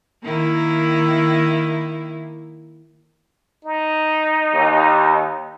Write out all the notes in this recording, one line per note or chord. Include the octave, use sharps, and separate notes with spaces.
D#3 A#3 E4
D#4
D#2